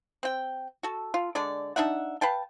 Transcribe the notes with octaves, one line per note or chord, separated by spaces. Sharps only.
C4 G5
F#4 A4
F4
D3 G#3 D5
D4 D#4 E5 F#5
B4 F5 G5 A5